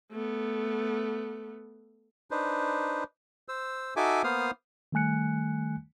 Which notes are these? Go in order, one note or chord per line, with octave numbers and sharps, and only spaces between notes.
A3 B3
D4 D#4 B4 C5
C5 E6
D#4 F#4 A4 E5 G#5 D6
A#3 B3 C5 F5 D#6 F6
D#3 G3 A3 G#5 F#6 C#7